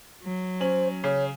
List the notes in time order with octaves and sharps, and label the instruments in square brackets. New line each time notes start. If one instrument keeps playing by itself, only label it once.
[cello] F#3
[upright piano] C#4 F#7 [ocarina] C5
[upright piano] C#3 [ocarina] C#5